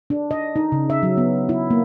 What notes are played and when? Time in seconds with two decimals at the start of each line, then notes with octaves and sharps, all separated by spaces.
0.10 D4
0.31 D#5
0.56 D#4
0.72 C#3
0.90 E5
1.03 F#3
1.17 B3
1.49 E4
1.70 A#3